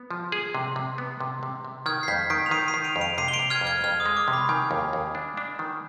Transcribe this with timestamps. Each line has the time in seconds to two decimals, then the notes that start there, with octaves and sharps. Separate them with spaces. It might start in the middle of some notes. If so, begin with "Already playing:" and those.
Already playing: B3
0.11 F3
0.32 G#4
0.55 C3
0.76 C3
0.98 B3
1.20 C3
1.43 C3
1.64 C3
1.86 D#3 F6 G#6
2.03 C7
2.08 F2 G6 B6
2.30 D#3 B6 D7
2.46 F7
2.51 D#3 C7 D#7
2.68 C7 D#7
2.74 D#3
2.84 D7 F7
2.96 F2
3.01 D7 F7
3.18 C3 C7 D#7
3.28 G7
3.34 D7 F7
3.39 C3
3.50 F6 G#6
3.61 F2
3.67 F6 G#6
3.84 F2 F6
4.00 D#6
4.06 G#3
4.17 D6
4.28 C3
4.33 B5
4.49 D#3 G#5
4.71 D#2
4.93 D#2
5.15 D4
5.37 D4
5.59 D#3